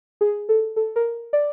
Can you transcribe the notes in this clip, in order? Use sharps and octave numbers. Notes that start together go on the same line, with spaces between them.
G#4
A4
A4
A#4
D5